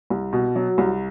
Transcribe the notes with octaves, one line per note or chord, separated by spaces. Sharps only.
C2
B2
F#3
C2